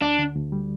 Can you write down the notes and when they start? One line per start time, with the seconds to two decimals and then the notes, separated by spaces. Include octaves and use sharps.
0.01 D2 D4
0.19 D3
0.35 D2
0.52 G3